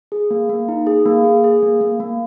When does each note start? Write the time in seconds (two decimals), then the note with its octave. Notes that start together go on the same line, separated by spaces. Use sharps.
0.12 G#4
0.31 A#3
0.49 A#3
0.68 D#4
0.87 G#4
1.06 A#3
1.24 G#4
1.44 G#4
1.63 A#3
1.81 A#3
2.00 A#3